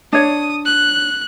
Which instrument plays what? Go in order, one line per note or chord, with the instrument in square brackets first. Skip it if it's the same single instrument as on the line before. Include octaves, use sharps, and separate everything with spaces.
[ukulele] D4 C#5 [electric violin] D#6
[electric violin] F#6